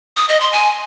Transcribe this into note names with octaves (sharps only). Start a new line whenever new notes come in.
D#6
D#5
C6
G#5